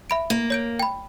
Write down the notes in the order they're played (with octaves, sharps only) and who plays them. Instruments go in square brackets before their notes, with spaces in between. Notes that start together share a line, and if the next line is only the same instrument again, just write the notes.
[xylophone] E5 B5 D7
[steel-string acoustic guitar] A#3
[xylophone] C#5 G6 D7
G5 B5